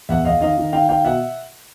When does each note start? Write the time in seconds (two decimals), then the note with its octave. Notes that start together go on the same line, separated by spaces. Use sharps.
0.09 E2 E5 F#5
0.25 E2 D#5 F5
0.41 D#3 D#5 F5
0.58 D#3
0.73 D#3 F5 G5
0.89 D#3 F5 G5
1.04 B2 E5 F#5